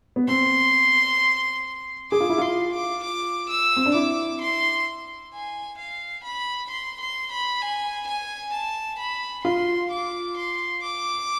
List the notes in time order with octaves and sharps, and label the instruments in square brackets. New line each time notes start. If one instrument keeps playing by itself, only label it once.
[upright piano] B3
[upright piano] C4 [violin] C6
[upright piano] G#4 [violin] D6
[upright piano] F4
E4
[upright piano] F4 [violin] C6
[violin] D6
D6
E6
[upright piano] C4
D4
[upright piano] E4 [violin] D6
[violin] C6
G#5
F5
B5
C6
C6
B5
G#5
G#5
A5
B5
[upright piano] F4 [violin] C6
[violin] D6
C6
D6